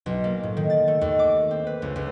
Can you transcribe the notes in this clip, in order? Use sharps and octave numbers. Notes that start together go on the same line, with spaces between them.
B1
A#3
A2
D#3
A6
A3
D#2
D6
C4
B4
C#2
C#2